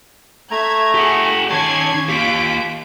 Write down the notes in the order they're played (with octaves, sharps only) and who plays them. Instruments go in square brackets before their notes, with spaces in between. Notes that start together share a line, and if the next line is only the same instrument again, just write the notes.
[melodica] A3 A#5 [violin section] E5 G#6
[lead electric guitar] G4 F#5 [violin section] G#4
[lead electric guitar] D#3 A5 [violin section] C#4 G#6 C7 [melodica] C#6
[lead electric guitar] A#3 G4 [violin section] F4 B6 D7